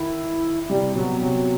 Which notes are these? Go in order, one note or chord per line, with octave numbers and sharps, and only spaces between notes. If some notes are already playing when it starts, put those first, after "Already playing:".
Already playing: D#3 E4
C3 G3
B2 F#3
C3 F#3